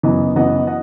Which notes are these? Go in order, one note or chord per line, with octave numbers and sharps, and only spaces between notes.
F#2 E3 B3 D#5
F#2 E3 B3 D#5 F#5
D#5 F#5